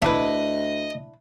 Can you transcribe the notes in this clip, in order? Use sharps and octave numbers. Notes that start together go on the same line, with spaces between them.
D2 D4 E4 B4 D#5 E5